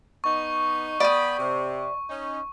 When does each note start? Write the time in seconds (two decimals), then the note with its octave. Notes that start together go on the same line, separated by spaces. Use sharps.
0.24 B3 D#4 C#6
1.00 B3 D5 G5 B5 D#6
1.38 C3
2.09 C#4 D#4